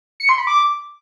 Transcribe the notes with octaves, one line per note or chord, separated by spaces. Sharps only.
C#7
C6
B5
D6